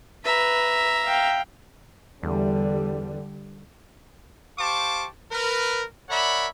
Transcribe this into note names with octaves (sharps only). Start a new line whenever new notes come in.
B4 E5 A#5
F5 G5
E2 D3 G3
G4 C5 F5 A5 C#6 D6
A#4 B4
A#4 C#5 D5 E5 F#5 B5